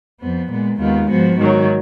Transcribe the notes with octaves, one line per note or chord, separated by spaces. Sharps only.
F2 F3 B3
A#2 G#3 B3
D#2 D#3 G#3 B3 F4
G#2 F3 B3 F#4
G#2 D#3 F#3